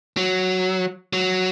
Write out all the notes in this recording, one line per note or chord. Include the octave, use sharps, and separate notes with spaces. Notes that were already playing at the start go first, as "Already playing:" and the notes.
F#3
F#3